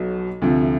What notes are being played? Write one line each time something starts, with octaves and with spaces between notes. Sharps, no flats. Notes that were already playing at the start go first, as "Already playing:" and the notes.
Already playing: B1 B2 F#3
D2 C3 F3